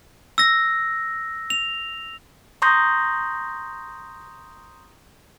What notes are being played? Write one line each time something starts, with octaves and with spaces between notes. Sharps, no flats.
E6 A#6
F7
A#5 C6 C#6 D#6 G6 A#6